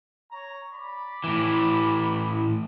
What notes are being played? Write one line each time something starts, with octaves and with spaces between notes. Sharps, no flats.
C#5 A#5
D5 B5
A2 E3